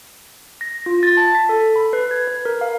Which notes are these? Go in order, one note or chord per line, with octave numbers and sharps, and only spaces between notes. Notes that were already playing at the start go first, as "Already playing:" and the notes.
A#6
F4
A6
A5
B6
A4
B5
B4
G#6
B4
A#4
F5